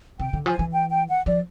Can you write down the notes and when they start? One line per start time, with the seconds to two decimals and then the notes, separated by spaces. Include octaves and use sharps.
0.19 C3 G5
0.33 D3
0.46 F3 G#5
0.59 E3
0.72 G5
0.90 G5
1.09 F#5
1.26 F3 D5